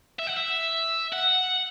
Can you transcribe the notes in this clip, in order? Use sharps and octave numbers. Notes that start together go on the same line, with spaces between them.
E5
F#5
E5
F#5